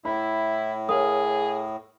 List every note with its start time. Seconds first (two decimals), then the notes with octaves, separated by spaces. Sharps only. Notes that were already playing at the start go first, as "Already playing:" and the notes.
0.05 A2 E4 B5
0.89 G#4 A#4 C#5 F5 D#6